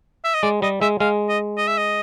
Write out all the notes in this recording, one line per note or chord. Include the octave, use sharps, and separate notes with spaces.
E5
D#5
G#3 D5
G3 D#5
G#3 E5
G#3 F5
D#5
D#5
E5
D#5